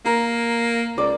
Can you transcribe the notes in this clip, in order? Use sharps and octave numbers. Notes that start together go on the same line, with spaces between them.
A#3 A#4
C#2 D5